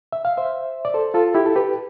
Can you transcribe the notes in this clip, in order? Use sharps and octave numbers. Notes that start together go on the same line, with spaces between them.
E5
F5
C5 E5
D5
A4 C5
F4 A4
E4 G4
A4
G4 B4